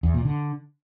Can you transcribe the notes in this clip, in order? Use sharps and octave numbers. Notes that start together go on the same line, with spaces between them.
E2
A#2
D3